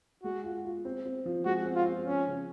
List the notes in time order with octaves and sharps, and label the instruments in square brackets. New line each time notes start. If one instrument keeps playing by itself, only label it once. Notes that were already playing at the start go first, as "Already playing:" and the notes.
[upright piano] G#3 [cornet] F#4
[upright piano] F4
F4
C4
C4
F3
[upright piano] G#3 [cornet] F#4
[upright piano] C4
[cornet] F4
[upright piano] C4
[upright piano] F3 [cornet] C#4
[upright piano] C#3